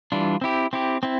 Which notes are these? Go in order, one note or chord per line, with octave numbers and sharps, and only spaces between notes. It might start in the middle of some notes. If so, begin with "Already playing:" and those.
E3 G3 D4 F4
C4 E4 G4
C4 E4 G4
C4 E4